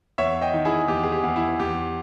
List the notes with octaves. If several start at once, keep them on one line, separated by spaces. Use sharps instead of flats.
E2 C#5 E5
D#5 G5
D#3
E4 G#4
E2 G4
G#4
G4
E2
E4
E2 G4